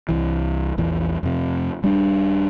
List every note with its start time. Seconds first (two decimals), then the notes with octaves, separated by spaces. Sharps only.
0.09 C2 E3
0.78 A#1 E2 E3
1.23 F2 C3
1.83 D#1 G3 C#4 D4